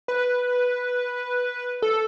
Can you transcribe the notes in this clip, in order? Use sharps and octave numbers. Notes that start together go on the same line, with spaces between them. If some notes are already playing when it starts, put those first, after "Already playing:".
B4
A4